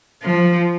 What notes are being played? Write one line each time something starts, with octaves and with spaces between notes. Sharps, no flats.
F3